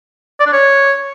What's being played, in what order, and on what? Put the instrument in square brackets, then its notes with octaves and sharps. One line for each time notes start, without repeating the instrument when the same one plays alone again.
[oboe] D5
D4
C#5